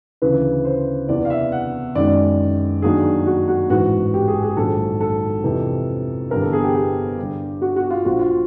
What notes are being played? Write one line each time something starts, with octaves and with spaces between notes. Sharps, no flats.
D2 C#3 E3 B4
C5
E2 C3 E3 D5
F5
E5
F#5
F#2 D#3 G#3 D5
G2 D#3 F#3 A#3 D4 G#4
F#4
F#4
A1 G#2 E3 F#4
G4
G#4
G#4
A#1 G#2 D#3 F#3 A4
A4
F2 C3 E3
G1 G2 E3 G3 B3 A#4
A4
G#4
G4
G4
G2 D3 G3
F#4
F#4
F4
A#1 A#2 F3 F#4
F4